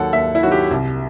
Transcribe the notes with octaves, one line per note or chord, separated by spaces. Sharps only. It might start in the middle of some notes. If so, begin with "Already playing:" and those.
Already playing: D#2 D#3 F#3 A4 F#5
D#2 E5
E4
D#3 F#3 F#4
G4
C2